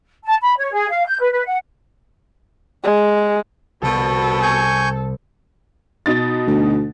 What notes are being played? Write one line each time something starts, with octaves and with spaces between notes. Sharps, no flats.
A5
B5
C#5
G#4
F5
G6
B4
B4
F#5
G#3
C2 B2 A4
G#5 C#6 G6
B2 D#4 A6
D2